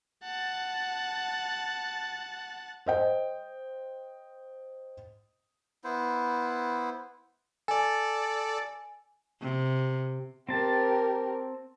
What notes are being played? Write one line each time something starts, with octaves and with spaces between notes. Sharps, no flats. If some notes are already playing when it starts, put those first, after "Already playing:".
F#5 A5
C5 D#5 G5
B3 E4 C5
A4 D5 G#5
C3
C4 G4 A#4 A5